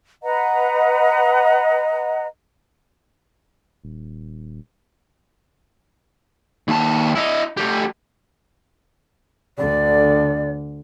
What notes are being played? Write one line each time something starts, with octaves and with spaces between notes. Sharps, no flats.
B4 D#5 F#5 A#5
D#1
D#2 A5
E4 D#5
A3 G4
D2 D3 D5